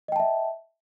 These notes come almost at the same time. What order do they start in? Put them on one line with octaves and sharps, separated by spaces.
D#5 G5 A5 E5